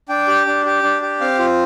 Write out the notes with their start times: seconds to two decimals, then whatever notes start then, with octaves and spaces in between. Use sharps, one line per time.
0.09 D4 G5
0.28 G4
0.47 D4
0.65 G4
0.83 D4
1.02 G4
1.21 C4 F5
1.39 F4